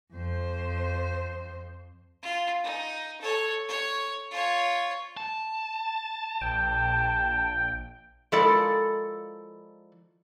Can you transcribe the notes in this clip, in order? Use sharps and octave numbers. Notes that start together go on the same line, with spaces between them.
F2 C5
F4
D#4
A4 C#5
C#5
F4 C#5
A5
A#1 G5
F3 G#3 E4 A4 A#4 D5